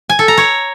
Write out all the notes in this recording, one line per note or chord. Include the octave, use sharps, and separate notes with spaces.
G#5
A4
A#5
C#5